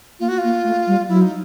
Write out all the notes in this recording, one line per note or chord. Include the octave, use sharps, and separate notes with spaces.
A#3 F4
F#4
A#3 F4
A3
G3
F#3 E4
D#4